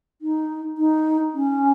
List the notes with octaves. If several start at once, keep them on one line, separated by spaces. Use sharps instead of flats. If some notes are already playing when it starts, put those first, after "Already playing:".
D#4
D#4
C#4